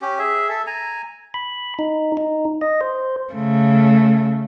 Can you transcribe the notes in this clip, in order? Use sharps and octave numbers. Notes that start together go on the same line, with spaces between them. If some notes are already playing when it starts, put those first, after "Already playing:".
C#4 G4
G#4 E5
A4 E5
G#5 A#5
B5
D#4
D#4
D#5
C5
C#3 A3